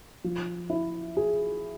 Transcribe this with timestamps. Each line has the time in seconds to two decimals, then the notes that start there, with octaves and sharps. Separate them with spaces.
0.24 F3
0.70 E4
1.17 G#4